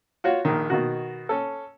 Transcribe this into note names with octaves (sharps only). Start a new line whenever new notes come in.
F4 F#4 C#5
A#1 D#3
B2 D#3 F#4
C#4 A4